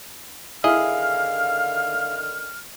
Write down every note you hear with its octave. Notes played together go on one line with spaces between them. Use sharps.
D3 D#3 E4 G#4 D#5 F5 F6